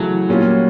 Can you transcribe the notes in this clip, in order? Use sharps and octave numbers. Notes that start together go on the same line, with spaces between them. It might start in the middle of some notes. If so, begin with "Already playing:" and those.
Already playing: C#3 E3 F#3 A3
A#2 G3 A#3 C#4 F4